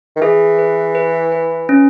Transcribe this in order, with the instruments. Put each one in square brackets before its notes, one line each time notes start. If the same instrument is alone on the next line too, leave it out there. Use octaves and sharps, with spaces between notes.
[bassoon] D#3
[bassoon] E3 [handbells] G#4
[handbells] B4
B4
B4
C#4